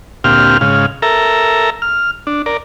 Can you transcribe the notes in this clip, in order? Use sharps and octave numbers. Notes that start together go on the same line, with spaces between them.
D2 A#2 C4 G4 F5 F6
G#2 C#3 F5
A4 A#4 E5 A#5
F6
D4
A#4 D5